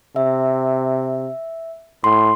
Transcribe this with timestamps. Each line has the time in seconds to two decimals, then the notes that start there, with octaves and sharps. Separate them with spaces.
0.16 C3 E5
2.04 A2 C6